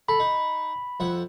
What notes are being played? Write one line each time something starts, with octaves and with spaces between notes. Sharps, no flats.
A4 B5
D#4
F2 E5 F#5